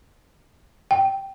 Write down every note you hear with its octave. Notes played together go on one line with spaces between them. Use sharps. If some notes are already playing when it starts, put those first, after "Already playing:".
G5